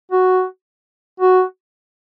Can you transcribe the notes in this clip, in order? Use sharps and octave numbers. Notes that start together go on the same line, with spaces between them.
F#4
F#4